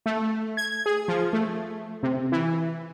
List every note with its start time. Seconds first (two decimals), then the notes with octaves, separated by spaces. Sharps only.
0.06 A3
0.57 G#6
0.86 G#4
1.08 F3
1.33 A3
2.03 C3
2.32 E3